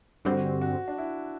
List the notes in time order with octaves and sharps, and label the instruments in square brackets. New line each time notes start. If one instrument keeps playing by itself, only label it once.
[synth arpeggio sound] G2 D3 G3 C4 [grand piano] F#4
[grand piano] F#4
D4
E4